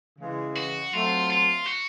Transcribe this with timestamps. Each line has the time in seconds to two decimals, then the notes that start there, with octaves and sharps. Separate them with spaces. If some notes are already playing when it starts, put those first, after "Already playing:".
0.19 C#3 E3 G#3
0.56 F#4
0.93 F#3 A3 C4 F4
1.30 F4
1.66 F#4